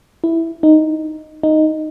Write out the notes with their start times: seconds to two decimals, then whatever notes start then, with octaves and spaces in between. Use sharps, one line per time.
0.24 E4
0.63 D#4
1.43 D#4